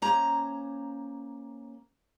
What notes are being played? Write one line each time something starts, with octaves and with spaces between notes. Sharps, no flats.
A#3 C#4 C5 A#5